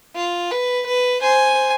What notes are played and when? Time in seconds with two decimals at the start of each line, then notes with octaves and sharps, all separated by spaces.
0.15 F4
0.51 B4
0.87 B4
1.22 C5 G#5